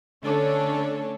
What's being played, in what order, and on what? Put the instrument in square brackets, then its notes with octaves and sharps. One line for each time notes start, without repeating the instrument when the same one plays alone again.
[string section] D3 A3 C#4 D4 A4 C#5